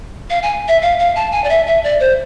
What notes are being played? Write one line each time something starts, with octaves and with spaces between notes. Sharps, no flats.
F5
G#5
E5
F5
F5
A5
G#5
D5
E5
E5
D5
C5